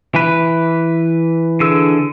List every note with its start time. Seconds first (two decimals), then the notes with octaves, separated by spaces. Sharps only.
0.15 E3 B4
1.60 D3 G#4 E6